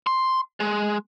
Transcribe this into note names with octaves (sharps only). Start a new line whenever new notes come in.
C6
G#3